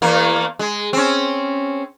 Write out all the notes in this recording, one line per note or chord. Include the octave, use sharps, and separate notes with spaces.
E2 A#3
G#3
C4 C#4